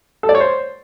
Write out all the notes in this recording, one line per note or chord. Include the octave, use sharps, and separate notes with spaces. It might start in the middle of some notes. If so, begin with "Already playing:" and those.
A4
D5
C#5
C5